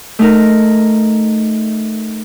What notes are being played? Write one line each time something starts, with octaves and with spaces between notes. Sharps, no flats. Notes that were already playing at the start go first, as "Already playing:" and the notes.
A3 D#4 A#4